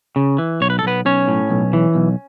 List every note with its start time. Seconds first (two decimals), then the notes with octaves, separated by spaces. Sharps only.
0.16 C#3
0.38 E3
0.61 B1 C#5
0.70 B4
0.79 A4
0.83 B1 B3 B4
1.05 B1 C#4 C#5
1.28 A2
1.50 B1
1.73 E3
1.95 B1